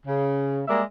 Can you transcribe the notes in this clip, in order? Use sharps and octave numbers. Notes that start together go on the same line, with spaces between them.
C#3
G3 G#3 A#3 A#4 D5 E5